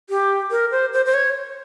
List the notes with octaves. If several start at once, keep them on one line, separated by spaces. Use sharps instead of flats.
G4
A#4
C5
C5
C5
C#5